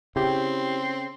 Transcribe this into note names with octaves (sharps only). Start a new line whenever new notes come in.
C#3 C4 E4 G4